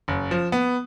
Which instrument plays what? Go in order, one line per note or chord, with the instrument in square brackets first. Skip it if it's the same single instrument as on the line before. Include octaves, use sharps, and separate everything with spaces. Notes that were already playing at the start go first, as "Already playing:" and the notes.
[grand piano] F#1
F3
B3